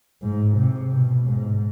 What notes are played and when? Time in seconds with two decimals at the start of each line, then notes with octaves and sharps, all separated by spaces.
0.22 G#2
0.56 C3
0.92 B2
1.28 G#2